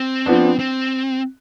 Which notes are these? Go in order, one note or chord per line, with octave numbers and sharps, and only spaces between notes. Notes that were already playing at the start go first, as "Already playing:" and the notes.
Already playing: C4
F3 B3 D4
C4